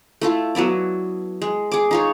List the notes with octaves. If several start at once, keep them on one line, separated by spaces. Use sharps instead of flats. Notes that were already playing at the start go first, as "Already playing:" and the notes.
A3 E4 F4
F#3 B3 E4 D5
G#3
G#4 D6
D#4 F4 C#5